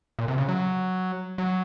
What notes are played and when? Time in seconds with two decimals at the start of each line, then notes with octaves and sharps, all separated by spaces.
0.19 A#2
0.28 C3
0.38 C#3
0.48 F#3
1.38 F#3